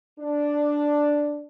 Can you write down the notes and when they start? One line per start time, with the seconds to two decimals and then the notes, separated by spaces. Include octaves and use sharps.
0.19 D4